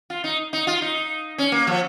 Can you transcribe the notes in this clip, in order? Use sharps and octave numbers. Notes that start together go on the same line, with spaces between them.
F4
D#4
D#4
F4
D#4
C#4
A#3
F3